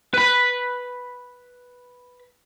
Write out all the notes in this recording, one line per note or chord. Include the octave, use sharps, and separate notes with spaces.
B4 B5